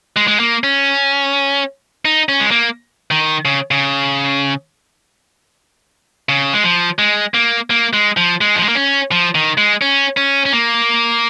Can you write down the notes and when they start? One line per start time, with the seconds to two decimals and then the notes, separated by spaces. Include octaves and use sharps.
0.16 G#3
0.28 G#3
0.40 A#3
0.64 C#4
2.05 D#4
2.29 C#4
2.40 G#3
2.51 A#3
3.11 D#3
3.45 C#3
3.71 C#3
6.29 C#3
6.53 G#3
6.64 F3
6.99 G#3
7.34 A#3
7.70 A#3
7.93 G#3
8.17 F3
8.41 G#3
8.55 F3
8.62 G#3
8.69 A#3
8.75 C#4
9.12 F3
9.35 D#3
9.58 G#3
9.82 C#4
10.17 C#4
10.45 C#4
10.53 A#3